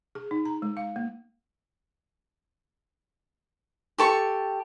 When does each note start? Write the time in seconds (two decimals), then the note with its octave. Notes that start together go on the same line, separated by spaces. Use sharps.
0.15 G#4
0.31 D#4
0.45 A#5
0.62 G#3
0.77 F5
0.96 A#3
3.98 G4 A4 C#6